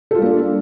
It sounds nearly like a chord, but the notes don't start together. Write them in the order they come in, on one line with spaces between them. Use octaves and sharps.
A4 F4 G3 A#3 D4